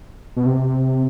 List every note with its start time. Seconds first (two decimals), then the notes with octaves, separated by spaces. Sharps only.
0.36 B2
0.46 C3